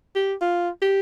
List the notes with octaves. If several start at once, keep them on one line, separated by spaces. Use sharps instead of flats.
G4
F4
G4